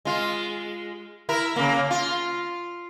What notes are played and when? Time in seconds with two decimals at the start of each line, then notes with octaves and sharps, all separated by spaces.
0.05 G#3 F4
1.29 E4 A#4
1.56 C#3 A#3
1.91 F4